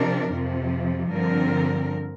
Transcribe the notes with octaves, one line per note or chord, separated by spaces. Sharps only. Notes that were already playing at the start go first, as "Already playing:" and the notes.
Already playing: C3 F3 D4 A#4
F2 C3 F3
G2 D3 F3 C4 A#4